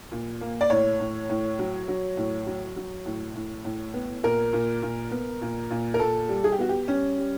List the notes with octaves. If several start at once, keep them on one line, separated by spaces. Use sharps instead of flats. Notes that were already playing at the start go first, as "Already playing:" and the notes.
A#2
A#3
D5
A2 C#5
A2
A2
F#3
F#3
A2
F#3
F#3
A2
A2
A2
B3
A#2 A#4
A#2
A#2
B3
A#2
A#2
A#4
A#2 A4
G3
G#4
G4
B3 F#4
G4
G3 C#4
G3